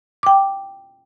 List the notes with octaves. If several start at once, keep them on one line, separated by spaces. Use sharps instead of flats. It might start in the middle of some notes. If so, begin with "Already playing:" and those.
G5 D6